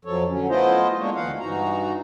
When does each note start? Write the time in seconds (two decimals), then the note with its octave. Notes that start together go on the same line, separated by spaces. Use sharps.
0.05 F2 F3 F#3 A4 C#5
0.28 D3 F#3 C#4
0.49 A3 B3 E4 F4 C5 D#5
0.98 G#3 A#3 D4 C#5
1.15 D2 E3 B3 F5 F#5
1.39 G2 E3 D#4 F#4 A#5